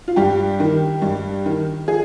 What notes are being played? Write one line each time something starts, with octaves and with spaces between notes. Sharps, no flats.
F4
G2 G4
D#3
G2
D#3
F3 G#4